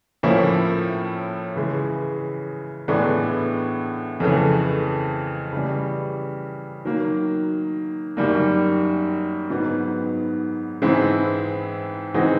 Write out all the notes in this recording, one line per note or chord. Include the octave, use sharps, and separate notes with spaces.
A2 F3 A#3 C#4 E4
C#3 E3 G#3
A2 E3 G#3 B3 D4
F2 C#3 E3 A3
C#3 E3 G3
D#3 F#3 A#3
F#2 D#3 G3 A#3
G#2 D#3 F#3 B3
G#2 E3 G#3 C4 E4
E3 G#3 C4 D#4 F#4